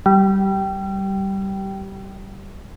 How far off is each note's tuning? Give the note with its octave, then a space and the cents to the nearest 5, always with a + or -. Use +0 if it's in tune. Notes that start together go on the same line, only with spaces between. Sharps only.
G3 -15